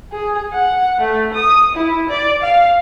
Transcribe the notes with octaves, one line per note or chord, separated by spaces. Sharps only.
G#4
F#5
A3
D#6
E4
D5
F5